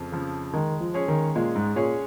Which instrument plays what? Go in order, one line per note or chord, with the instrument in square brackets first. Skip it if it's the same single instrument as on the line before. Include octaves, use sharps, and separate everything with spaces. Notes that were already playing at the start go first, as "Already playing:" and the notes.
Already playing: [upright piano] F2 C#3 F3
C#3 F3
[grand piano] D#3 [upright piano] G#3
[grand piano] F3
[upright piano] C#4 G#4 C#5
[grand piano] D#3
[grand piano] A#2 [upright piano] G#3
[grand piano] G#2
[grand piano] A#2 [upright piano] C#4 G#4 C#5